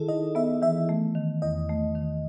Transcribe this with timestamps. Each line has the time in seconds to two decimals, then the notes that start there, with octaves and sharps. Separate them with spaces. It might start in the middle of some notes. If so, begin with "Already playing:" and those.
Already playing: D#3 E4 G#4 A4
0.08 D#4 D#5
0.35 B3 E5
0.62 E3 E5
0.89 A3
1.15 D#3
1.42 E2 D#5
1.69 A3
1.95 D#3